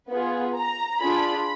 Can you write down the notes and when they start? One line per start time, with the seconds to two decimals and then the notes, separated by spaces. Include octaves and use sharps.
0.10 B3 F4 G#4 B4
0.56 A#5
1.02 D4 F4 G#4 B5